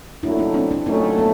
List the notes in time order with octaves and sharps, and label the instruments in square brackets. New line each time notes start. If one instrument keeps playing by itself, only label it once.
[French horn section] A#2 F#3 A3 [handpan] D4 E4
[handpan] C#4 D#4
C4 D4
C4 D4
[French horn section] A#2 F#3 A3 [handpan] C#4 D#4
[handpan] B3 C#4